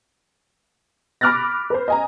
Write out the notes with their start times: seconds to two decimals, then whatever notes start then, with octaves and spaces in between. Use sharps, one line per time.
1.21 B5 D6 F6 F#6 A6 A#6
1.70 B4 C5
1.88 D#5 G#5 A#5